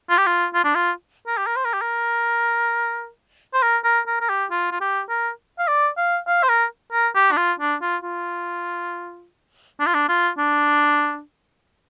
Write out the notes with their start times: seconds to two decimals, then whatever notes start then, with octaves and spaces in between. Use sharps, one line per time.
0.10 F4
0.18 G4
0.26 F4
0.54 F4
0.64 D4
0.75 F4
1.27 A#4
1.38 G4
1.47 A#4
1.56 C5
1.64 A#4
1.74 G4
1.82 A#4
3.54 C5
3.62 A#4
3.84 A#4
4.07 A#4
4.21 A#4
4.29 G4
4.51 F4
4.71 F4
4.81 G4
5.09 A#4
5.59 F5
5.68 D5
5.97 F5
6.27 F5
6.43 C5
6.49 A#4
6.93 A#4
7.15 G4
7.32 D4
7.37 F4
7.60 D4
7.81 F4
8.03 F4
9.80 D4
9.87 F4
9.94 D4
10.09 F4
10.38 D4